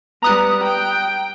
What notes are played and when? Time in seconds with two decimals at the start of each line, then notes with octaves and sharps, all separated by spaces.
0.23 G3 B3 A#5 D#6 F#6
0.64 G5